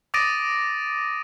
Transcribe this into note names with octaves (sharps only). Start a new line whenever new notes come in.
D6 D#6 A6 A#6 D7 D#7